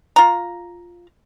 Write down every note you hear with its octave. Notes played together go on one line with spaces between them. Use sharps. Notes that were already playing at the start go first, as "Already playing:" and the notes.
F4 A#5